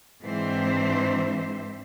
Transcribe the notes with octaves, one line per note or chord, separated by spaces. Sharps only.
G#2 E3 C4 D4 C5 E5